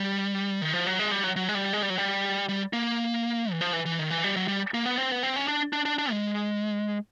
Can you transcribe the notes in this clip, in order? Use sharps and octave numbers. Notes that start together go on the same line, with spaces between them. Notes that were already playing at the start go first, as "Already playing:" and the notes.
Already playing: G3
D#3
F3
F#3
G#3
G3
F#3
F#3
G#3
G3
G#3
G3
F#3
G3
G3
A#3
E3
F3
E3
E3
D#3
E3
G3
F#3
G3
A#3
B3
C4
B3
C4
C#4
D4
D4
D4
D4
G#3